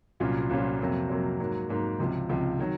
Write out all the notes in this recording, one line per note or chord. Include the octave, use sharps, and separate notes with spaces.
C2 A#2 F#3 C#4 F4
C2 A#2 F#3 C#4 F4
F2 C3 F#3 A#3
F2 C3 F#3 A#3
G#2 F#3 A#3
G#2 F#3 A#3
C#2 C3 F3
C#2 C3 F3
D#3 F#3